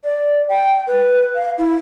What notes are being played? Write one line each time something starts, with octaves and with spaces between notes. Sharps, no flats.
D5
G5
B4
F5
E4